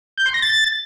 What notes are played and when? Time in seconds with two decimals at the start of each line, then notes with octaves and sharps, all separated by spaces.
0.18 G6
0.26 C6
0.34 A#6
0.42 A6